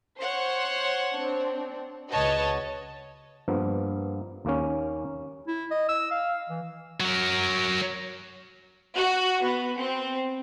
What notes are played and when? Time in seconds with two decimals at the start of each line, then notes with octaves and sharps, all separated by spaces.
0.19 C5 C#5 F#5
1.13 C4 D4
2.10 C#2 F#4 B4 C#5 D#5 A5
3.48 G2 F3 A#3 B3
4.45 D#2 A#3 C#4
5.47 E4
5.71 D#5
5.89 E6
6.11 F5
6.49 E3
7.00 F#3 A#4
8.95 F#4
9.43 B3
9.78 C4